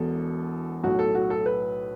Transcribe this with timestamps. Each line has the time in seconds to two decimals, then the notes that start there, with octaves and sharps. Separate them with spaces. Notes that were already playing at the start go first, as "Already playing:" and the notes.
Already playing: E1 E2 B2 A4
0.83 B1 A2 F#3 F#4
0.99 A4
1.15 F#4
1.30 A4
1.46 B4